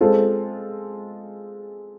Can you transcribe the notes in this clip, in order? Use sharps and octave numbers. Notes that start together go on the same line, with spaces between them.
G#3 C4 F4 A4